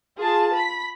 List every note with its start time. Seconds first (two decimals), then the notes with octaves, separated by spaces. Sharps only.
0.17 F4 G#4 A5
0.55 B5 B6